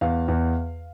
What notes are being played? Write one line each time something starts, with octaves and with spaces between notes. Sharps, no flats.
E2 F5
E2